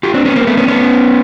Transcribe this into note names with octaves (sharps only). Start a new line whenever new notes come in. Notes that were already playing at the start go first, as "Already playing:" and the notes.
F4 G4
C4 D4
B3 C#4
A#3 C4
A3 B3
B3 C#4
B3 C#4